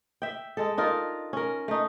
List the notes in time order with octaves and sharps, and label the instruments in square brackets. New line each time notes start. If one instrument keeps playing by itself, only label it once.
[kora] E5 G5
G#3 A4
D4 D#4 F4 A#4
C#4 A#4
A3 D#4